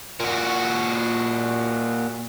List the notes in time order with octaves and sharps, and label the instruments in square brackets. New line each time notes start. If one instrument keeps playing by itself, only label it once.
[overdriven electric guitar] A#2 F#4